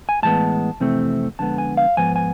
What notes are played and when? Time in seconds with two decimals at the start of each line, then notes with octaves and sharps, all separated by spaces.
0.09 G#5
0.23 A2 E3 G#3 B3 A5
0.80 F2 C3 E3 A3 C4
1.39 F2 D3 G#3 B3 A5
1.58 G#5
1.77 F5
1.97 G#2 F3 B3 G#5
2.16 G#5